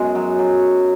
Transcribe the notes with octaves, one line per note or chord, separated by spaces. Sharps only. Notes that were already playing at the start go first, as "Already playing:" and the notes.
Already playing: F#2 G#3 B3
F#3
F#3